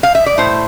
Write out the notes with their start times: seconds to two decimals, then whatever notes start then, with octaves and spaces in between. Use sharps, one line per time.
0.03 F5
0.15 E5
0.26 D5
0.38 A2 C5